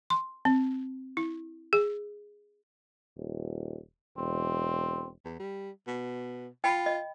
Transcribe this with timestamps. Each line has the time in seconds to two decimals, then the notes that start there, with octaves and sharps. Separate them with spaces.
0.10 C6
0.45 C4
1.17 E4
1.73 G#4
3.16 D#1
4.17 E1 C4
5.25 E2
5.39 G3
5.87 B2
6.64 F4 G5 B5
6.86 D#5